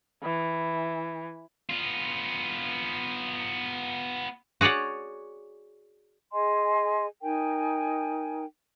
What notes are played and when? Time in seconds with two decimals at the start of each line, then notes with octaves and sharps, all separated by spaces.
0.23 E3
1.70 B3 F4
4.61 F#4 G#4 C#5 D5 F#5
6.33 G#4 D#5 G#5 C6
7.22 D#4 A#4 G5 G#5